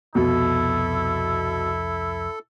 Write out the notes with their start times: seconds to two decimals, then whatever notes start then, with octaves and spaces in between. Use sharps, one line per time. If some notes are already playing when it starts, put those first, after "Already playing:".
0.15 C2 F2 B2 E4 A4